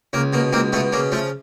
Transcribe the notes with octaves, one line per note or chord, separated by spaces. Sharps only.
C#2 A#3
B2 A#3
C#2 A#3 C4
B2 A3 B3
C#3 A#3
F3 A3